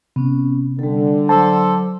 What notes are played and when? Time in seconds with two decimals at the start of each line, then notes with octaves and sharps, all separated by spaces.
0.16 C3 B3 C#4
0.79 D3 G3 A4
1.29 F#3 A4 C5 A5 D6